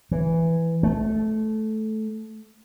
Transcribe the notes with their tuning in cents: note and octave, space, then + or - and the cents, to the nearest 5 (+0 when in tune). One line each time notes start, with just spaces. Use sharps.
E3 +5
A3 -15